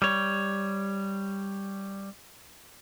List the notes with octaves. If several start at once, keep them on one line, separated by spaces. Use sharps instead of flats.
G3 C#5